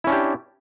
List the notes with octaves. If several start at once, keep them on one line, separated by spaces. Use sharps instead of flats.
C#4 D4 E4 G4